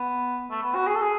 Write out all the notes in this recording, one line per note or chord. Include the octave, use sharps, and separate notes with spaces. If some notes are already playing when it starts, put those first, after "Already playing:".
Already playing: B3
A3
B3
F#4
G#4
A4
G#4